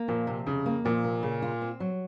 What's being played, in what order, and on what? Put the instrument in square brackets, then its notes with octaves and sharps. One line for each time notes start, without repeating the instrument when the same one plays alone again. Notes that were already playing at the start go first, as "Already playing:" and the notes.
Already playing: [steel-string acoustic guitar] A#3
[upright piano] A#2 [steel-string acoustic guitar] F3
[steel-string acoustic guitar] C3
[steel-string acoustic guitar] F2 [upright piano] C#3
[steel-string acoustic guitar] A#3
[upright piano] A#2 [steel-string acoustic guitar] F3
[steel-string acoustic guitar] C3
C#3
F4
C4
F#3